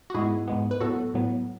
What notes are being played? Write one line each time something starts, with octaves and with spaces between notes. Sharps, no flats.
F#4
G#2 G#3 B3 E4 G#4
G#2 G#3 B3
B4
A2 F#3 B3 F#4 A4
A2 F#3 B3